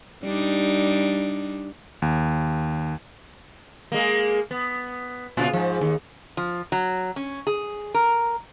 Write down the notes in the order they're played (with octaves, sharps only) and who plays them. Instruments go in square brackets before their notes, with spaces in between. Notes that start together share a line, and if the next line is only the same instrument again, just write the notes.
[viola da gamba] G3 D4 D#4
[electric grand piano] D#2
[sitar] G#3 A#3
B3
A#2 C#3 F4
G#2 F3
D#2
[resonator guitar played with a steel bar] F3
F#3
C#4
G#4
A#4